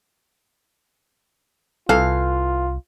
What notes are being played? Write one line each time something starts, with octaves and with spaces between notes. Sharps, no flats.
C2 E3 F4 A4 F5